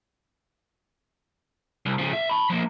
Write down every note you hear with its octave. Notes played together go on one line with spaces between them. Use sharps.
C2
C#3 F3
E5
A5 B5
F3 A#3